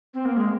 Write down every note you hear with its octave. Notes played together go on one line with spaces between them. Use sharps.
C4
A#3
G#3